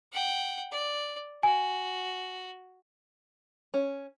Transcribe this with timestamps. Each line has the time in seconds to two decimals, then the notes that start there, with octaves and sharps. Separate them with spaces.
0.13 F#5 G5
0.71 D5
1.43 F#4 G#5
3.74 C#4